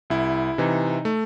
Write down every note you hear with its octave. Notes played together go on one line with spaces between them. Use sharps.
C2 E4
C3 E3 D#4
A3